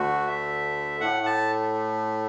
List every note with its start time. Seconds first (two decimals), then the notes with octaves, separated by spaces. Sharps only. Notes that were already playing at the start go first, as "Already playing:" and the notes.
Already playing: D2 D3 A3 F#4
0.27 E5
1.00 A2 A3 F#5
1.26 A5